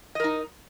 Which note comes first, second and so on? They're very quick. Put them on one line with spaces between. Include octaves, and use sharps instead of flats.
D#5 A#4 D#4